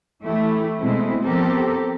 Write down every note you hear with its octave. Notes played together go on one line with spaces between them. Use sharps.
E3 A3 E4 G4
B2 G#3 A3 C4 E4
F3 B3 C4 G4 A4 A#4